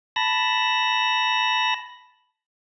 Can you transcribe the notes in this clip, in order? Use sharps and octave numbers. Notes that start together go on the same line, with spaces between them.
A5 B5 A#6